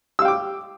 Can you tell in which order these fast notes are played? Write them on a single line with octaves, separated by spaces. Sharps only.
E6 F5 G5 D6